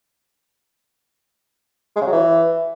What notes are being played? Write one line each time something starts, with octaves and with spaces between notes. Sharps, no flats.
G#3
C#3
F#3
E3